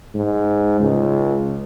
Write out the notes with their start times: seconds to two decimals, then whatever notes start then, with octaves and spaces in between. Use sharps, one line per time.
0.15 G#2
0.80 C#2